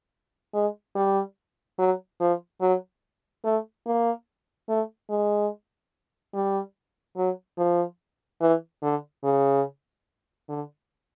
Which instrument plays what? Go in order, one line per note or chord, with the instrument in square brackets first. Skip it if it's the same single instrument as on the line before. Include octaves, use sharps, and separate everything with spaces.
[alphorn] G#3
G3
F#3
F3
F#3
A3
A#3
A3
G#3
G3
F#3
F3
E3
D3
C#3
D3